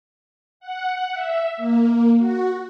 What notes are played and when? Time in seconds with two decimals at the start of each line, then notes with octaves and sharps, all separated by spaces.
0.60 F#5
1.13 E5
1.57 A#3
2.18 F#4